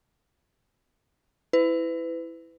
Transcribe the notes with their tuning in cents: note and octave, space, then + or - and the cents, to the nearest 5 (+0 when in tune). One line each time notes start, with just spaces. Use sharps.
E4 +0 B4 +30